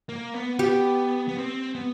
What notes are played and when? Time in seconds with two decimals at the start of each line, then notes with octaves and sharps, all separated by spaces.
0.09 A#3
0.34 B3
0.59 B3 G4
1.28 B3
1.37 C4
1.75 B3